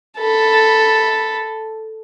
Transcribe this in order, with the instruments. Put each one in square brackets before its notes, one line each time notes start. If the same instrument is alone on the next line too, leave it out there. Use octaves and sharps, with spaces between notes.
[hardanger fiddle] A4 B5